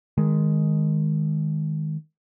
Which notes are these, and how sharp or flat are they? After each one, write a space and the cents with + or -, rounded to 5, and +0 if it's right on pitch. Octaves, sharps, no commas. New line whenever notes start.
D#3 +0 G#3 +0